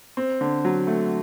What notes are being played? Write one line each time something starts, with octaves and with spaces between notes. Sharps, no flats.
C4
D3
F#3
A3